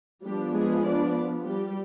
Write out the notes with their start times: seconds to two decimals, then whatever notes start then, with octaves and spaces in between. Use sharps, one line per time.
0.24 F3 G3 B3 D4 G4
0.54 G#3 G#4
0.85 D4 D5
1.46 G3 G4